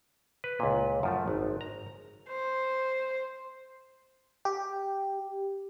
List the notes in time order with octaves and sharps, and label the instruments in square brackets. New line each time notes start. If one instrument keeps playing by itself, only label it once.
[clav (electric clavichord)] B4
C#2 A#2
F#2 F3 A3
G#1
A#5
[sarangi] C5
[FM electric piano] G4